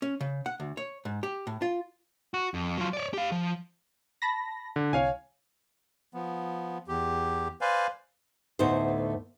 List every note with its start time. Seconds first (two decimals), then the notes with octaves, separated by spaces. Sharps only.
0.02 C#4
0.21 C#3
0.46 F#5
0.60 D2
0.77 C#5
1.05 G#2
1.23 G4
1.47 A2
1.62 F4
2.34 F#4
2.54 F2
2.78 F#3 F4
2.93 C#5 D5
3.13 G4 F5
3.32 F3
4.22 A5 B5 A#6
4.76 D3
4.93 C2 C#5 F5 G#5
6.14 F3 B3
6.88 E2 G4
7.61 B4 C5 D5 F5 G#5
8.59 D2 A2 A3 B3 D#4 C5